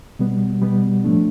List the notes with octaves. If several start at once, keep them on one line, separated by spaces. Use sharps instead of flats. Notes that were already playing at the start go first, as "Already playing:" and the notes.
B2 G3 B3
B2 G3 B3
A2 F3 A3 D4